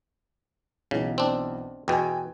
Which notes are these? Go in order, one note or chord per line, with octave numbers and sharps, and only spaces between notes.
B1 C#3 E3
C4 D4
E2 B2 G5 G#5